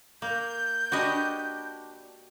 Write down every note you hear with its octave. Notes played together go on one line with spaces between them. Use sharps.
A#3 G6
D4 F#4 G4 B4 D#5